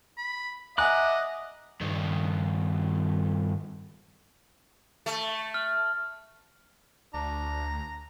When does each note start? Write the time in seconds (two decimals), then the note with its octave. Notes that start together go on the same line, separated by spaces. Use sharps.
0.18 B5
0.78 D#5 E5 F#5 G#5 A#5 D6 F#6
1.81 G2 D#3
5.06 A3
5.54 F6
7.14 D2 D4 A#5